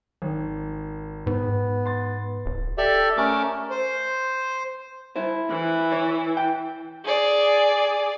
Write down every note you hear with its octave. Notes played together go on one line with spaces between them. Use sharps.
G#1 D#3
G#2 B3
C6 A6
D1
G4 A4 D5 E5
A3 C#4 A#4 D6
C5
E4 C5
E3
C#5
G5
G#4 D5